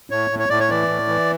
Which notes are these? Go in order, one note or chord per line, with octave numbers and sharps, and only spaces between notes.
A2 C#5
A2
C#5
A2 D5
C#5
E3 D5
A2
E3